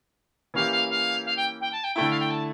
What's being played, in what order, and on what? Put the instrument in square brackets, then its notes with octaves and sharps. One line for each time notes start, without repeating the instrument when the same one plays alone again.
[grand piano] E3 A#3 C#4 G4 [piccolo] F5
[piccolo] F5
F5
F5
G5
G5
A5
G5
[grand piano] D3 A3 E4 [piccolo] G5
[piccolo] F5
G5
A5